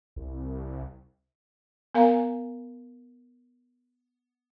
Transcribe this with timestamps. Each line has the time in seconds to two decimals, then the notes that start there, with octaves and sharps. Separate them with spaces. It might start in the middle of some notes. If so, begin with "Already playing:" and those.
0.16 C2
1.94 B3 A#4 F5 G#5 A#5